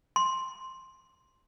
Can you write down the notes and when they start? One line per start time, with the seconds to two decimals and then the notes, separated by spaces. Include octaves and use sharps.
0.16 C6